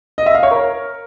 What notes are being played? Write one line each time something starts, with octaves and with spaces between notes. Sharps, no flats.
D#5
E5
F5
C#5
A#4